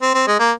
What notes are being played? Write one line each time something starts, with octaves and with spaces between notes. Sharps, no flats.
C4
C4
G#3
A#3